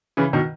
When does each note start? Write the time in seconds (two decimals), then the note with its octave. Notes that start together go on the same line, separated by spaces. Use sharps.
0.17 C#3 E3
0.33 B2 D#3